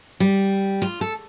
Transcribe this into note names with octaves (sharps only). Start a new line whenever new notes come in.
G3
F4
A4